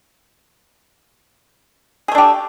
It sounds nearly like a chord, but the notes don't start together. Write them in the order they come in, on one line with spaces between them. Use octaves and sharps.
G#4 A3 D4 G4